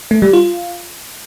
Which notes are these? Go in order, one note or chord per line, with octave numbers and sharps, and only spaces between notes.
A3
G3
F4